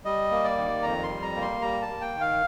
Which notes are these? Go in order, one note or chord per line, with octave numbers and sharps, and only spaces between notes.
G3 D#5
A#3
D5
D#3
F2 A#5
C6
G3
A#5
A#3
C6
G3 A#5
A5
A#3
G5
D#3
F5